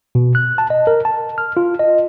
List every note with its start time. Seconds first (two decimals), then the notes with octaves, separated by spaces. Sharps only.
0.15 B2
0.35 F#6
0.58 A5
0.70 D#5
0.87 A#4
1.05 A5
1.38 F6
1.57 F4
1.80 D#5